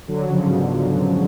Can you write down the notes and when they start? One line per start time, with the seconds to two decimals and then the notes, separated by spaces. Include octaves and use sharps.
0.08 D3 F#3
0.27 C#3 F3
0.45 G#2 B2